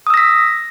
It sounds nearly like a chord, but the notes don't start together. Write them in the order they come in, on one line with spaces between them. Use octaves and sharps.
D#6 E6 A#6 B6